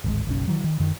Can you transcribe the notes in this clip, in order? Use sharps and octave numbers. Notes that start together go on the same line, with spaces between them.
D1 G#1 G#3
F#1 B1 C#4
D#3 E3 F#3
D#3
F#2 D#3